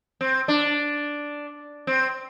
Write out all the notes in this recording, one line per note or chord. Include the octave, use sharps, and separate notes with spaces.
C4
D4
C4